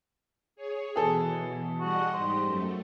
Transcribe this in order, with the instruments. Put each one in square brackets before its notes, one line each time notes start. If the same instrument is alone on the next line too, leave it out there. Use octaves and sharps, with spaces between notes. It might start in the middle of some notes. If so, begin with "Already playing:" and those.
[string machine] G#4 C#5
[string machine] B2 E3 [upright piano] G#4 A4
[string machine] G3 D#5 F#5 [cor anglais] F#4
[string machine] G#2 G4 D#5 [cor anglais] C5
[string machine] F#2 A3